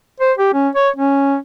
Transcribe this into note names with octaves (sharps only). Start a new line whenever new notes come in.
C5
G4
C#4
C#5
C#4